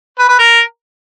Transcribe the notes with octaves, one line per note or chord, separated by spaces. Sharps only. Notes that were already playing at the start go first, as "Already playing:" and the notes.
B4
B4
A#4